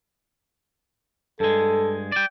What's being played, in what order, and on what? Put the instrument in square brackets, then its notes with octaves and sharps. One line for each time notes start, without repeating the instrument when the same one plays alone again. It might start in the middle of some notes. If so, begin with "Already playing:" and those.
[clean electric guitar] G2 G#3 [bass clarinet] A4
[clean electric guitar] D5 G5